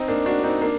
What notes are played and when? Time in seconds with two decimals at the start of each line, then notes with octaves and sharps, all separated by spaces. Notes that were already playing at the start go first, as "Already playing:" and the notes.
Already playing: C4 D#4
0.08 A#3 D4
0.26 D4 F#4
0.44 C4 D#4
0.61 A#3 D4